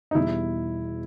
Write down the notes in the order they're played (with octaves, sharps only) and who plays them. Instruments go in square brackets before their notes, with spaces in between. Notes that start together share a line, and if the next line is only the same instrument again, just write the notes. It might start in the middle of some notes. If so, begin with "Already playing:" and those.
[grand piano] D#4
[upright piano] E2 B2 G3 [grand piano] E4